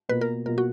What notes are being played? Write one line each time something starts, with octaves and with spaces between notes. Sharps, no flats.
B2 A#3 F4 B4
A#4
B2 A#3 F4 A#4
F#4